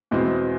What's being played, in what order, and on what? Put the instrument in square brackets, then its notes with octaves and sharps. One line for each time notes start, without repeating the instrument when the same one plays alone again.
[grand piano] E2 B2 G#3 C4 E4